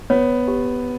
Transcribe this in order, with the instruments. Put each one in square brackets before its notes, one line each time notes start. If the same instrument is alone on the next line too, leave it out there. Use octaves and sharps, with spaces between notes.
[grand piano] B3 [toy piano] C#5
[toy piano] G4